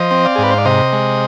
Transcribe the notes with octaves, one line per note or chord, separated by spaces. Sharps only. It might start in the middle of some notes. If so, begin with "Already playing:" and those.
Already playing: F3 C5 D#5
C4
D5 F5
G#4
G#2
B4
C5
D5
C3 C5 D#5
G#3